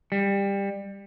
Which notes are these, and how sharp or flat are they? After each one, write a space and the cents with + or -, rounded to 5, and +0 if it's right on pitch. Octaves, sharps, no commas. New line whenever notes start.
G3 +20